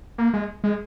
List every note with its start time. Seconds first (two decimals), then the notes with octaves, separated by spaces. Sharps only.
0.18 A#3
0.33 G#3
0.64 G#3